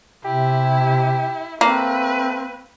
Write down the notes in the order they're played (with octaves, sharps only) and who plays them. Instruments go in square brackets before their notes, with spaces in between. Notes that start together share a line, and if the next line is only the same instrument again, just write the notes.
[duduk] C3 [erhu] E4 [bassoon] G4
[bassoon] A3 [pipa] A#3 [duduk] C4 [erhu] B4